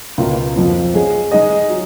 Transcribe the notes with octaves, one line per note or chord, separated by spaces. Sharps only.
C#2 B2 A#3 F4
F2 F3 A#3
G#3 C#4 G#4
G#3 D#4 G#4 D#5
F#3